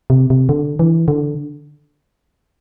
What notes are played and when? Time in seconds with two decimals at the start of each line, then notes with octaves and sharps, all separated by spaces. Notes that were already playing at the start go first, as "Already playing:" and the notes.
0.10 C3
0.30 C3
0.49 D3
0.79 E3
1.08 D3